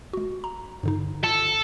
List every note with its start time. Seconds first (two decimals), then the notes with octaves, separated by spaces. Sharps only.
0.13 G#3 F#4
0.44 A#5
0.83 G2 D3 D#4
1.24 F4 A4